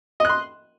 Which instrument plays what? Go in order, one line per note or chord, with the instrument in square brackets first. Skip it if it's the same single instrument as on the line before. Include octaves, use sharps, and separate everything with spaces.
[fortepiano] D#5
F#6
C6